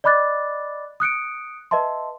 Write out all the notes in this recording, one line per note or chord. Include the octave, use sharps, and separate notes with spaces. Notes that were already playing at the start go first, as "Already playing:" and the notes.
D5 D#5 B5 D6 F#6 A6
D#6 F#6 C#7 D7
B4 D#5 E5 A5 C6